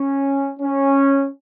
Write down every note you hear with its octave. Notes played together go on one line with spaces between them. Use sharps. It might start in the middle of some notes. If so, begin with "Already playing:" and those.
Already playing: C#4
C#4